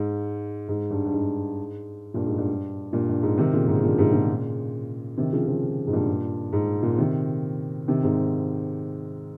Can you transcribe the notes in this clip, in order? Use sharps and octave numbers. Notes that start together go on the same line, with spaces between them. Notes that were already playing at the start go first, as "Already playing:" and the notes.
Already playing: G#2
G#2
G2
G2
G#2
G2 A#2
G#2
G2
G2 A#2
G2
G#2
C3 D#3
A#2 C#3
G#2
G2 A#2
G#2 C3
A#2 C#3
C3 D#3
C#3 F3
C#3 F3
G#2
G2 A#2
G#2
A#2 C#3
C3 D#3
C3 D#3
G#2 C3